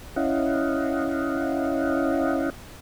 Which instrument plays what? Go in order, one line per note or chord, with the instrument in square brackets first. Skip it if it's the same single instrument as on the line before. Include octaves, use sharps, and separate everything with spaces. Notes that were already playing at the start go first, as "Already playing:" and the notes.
[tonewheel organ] C#4 E4 D#5 F5 F#5